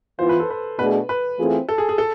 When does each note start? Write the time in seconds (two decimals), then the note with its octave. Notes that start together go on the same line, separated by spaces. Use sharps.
0.18 E3 B3 F4 C5
0.29 B4
0.40 A4
0.50 B4
0.78 B2 A3 D4 G#4 B4
1.09 B4
1.38 E3 A3 C4 F4 G#4
1.69 A4
1.78 G#4
1.89 G#4
1.98 A4